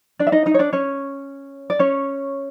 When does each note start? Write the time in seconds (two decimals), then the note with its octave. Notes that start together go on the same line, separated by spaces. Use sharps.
0.19 D4 D5
0.27 E5
0.32 D#4 D#5
0.46 D#4 D#5
0.54 C#5
0.59 D4 D5
0.73 C#4 C#5
1.70 D5
1.79 C#4 C#5